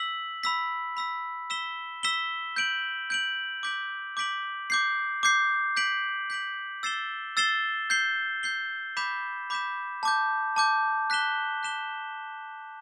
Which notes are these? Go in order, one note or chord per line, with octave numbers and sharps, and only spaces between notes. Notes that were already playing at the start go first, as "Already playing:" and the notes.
Already playing: E6 B6 F#7
B5 E6 B6
B5 E6 B6
E6 B6 E7 G7
E6 B6 E7 G7
G6 D7 F#7
G6 D7 F#7
D6 G6 B6 D7 F#7
D6 G6 B6 D7 F#7
D6 G6 C7
D6 G6 C7
G6 B6 D7 F#7
G6 B6 D7 F#7
E6 A6 C7 E7 G7
E6 A6 C7 E7 G7
G6 C7 G7
G6 C7 G7
B5 D6 G6 B6 E7
B5 D6 G6 B6 E7
A5 D6 G6
A5 D6 G6
F#6 B6 E7 G7
F#6 B6 E7 G7